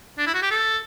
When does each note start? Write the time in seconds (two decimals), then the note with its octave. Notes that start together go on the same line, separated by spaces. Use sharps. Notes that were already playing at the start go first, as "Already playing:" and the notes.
0.18 D4
0.27 E4
0.34 F#4
0.42 G4
0.51 A4